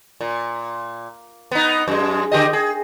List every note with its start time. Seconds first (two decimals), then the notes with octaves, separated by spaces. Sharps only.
0.21 A#2
1.51 B3 D#4
1.88 F#2 G#3
2.32 D3 G4 D#5
2.53 G#4